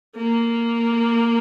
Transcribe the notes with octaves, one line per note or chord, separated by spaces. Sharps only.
A#3